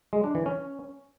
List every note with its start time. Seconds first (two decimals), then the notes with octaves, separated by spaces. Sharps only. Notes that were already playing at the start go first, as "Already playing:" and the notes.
0.13 G#3
0.24 D4
0.35 E3
0.46 C#4